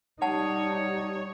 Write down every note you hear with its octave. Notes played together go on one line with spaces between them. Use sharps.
G3 D#4 C#5 F#5 A5